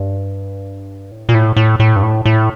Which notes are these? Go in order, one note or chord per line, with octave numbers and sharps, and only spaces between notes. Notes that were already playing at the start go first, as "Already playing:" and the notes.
Already playing: G2
A2
A#2
A2
A2
A2
G2
A2
A2